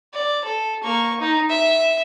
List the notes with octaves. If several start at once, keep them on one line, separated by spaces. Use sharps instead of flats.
D5
A4
A#3 C#6
D#4
E5